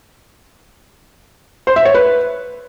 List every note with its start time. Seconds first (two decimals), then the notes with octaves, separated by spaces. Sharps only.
1.67 C5
1.76 E5
1.85 C#5
1.94 B4